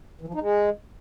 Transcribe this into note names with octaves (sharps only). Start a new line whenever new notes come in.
E3
F3
D#4
G#3